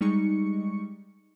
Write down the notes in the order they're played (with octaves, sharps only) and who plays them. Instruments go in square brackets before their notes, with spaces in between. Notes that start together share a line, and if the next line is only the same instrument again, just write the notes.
[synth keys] G3 G#3 D#4 C#6 C#7